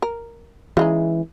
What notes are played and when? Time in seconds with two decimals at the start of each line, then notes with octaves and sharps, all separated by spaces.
0.02 A#4
0.77 C#3 E3 G#3 D#4